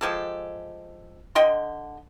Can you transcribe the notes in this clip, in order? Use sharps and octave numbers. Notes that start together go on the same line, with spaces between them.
F3 G#3 G4 A4
D3 D#5 G5 C6